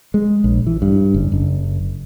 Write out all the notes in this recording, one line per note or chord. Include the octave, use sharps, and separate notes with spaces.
G#3
A#1
E3
G2
F#1
F#1